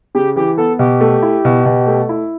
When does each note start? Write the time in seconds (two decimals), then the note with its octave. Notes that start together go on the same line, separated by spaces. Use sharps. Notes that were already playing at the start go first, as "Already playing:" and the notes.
0.15 C#3 G4
0.36 E3 G4
0.57 B3 A4
0.79 B2 G4
1.01 A3
1.22 E4
1.45 B2
1.66 B2
1.87 A3
2.09 E4